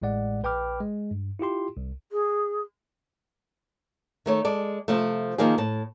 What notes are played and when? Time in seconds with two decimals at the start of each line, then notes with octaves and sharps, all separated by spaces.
0.02 A1 A2 G#3 D5 F#5
0.43 A#1 B4 G5 B5 D6 F6
0.81 G#3
1.11 G2
1.39 E4 F4 G4 C6
1.77 C2
2.12 G#4
4.26 D#3 A3 C#5
4.45 G#3 A4 D5
4.88 C3 F3 A3
5.38 D#3 F3 A#3 D#4 G#4
5.58 A2 A5